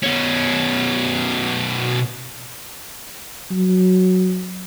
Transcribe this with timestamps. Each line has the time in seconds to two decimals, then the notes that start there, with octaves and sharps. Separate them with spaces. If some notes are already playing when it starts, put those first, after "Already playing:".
0.03 B2 C#4
3.51 F#3